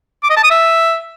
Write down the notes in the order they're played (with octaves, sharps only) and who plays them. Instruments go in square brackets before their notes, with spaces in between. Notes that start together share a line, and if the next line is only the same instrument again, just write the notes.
[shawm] D6
D#5
A5
D#6
E5